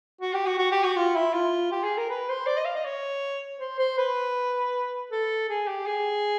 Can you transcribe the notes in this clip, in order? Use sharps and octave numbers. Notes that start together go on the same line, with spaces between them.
F#4
G4
F#4
F#4
G4
F#4
F4
E4
F4
G4
G#4
A#4
B4
C5
D5
D#5
F5
D#5
C#5
C5
C5
B4
A4
G#4
G4
G#4